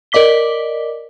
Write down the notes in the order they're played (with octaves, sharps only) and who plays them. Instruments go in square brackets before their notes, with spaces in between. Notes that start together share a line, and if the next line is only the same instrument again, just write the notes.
[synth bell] A#4 D5 D#5 D6 B6 G7